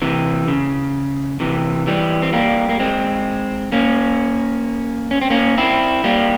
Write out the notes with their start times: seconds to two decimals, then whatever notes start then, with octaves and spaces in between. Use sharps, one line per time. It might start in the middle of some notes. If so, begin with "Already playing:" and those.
0.02 C3 E3
0.48 C#3
1.40 C3 E3
1.87 E3 G3
2.22 C4
2.33 G3 A#3
2.69 A#3
2.79 G#3 C4
3.72 A#3 C#4
5.11 C#4
5.21 C4
5.30 A#3 C#4
5.58 C4 E4
6.04 G3 A#3